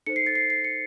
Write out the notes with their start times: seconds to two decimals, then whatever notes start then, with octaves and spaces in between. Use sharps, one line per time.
0.06 D#4 A4 C5 C#7
0.16 C7
0.26 A6
0.35 C7
0.50 C7
0.64 C#7